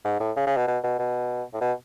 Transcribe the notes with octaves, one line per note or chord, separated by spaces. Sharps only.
G#2
A2
C#3
C#3
B2
B2
B2
B2
A2
B2